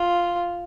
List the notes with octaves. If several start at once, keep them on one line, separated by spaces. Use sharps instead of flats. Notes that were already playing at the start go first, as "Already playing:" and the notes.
Already playing: F4